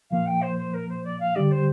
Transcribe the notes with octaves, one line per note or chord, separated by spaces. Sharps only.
A#2 F3 A#3 F5
G5
C5
C5
A#4
C5
D5
F5
D3 G3 D4 G4 D5
C5